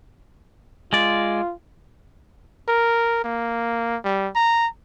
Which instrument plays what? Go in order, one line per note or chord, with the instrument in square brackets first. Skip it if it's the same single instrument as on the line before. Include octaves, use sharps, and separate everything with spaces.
[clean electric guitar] G#3 D5 [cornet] F4
[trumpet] A#4
A#3
G3
A#5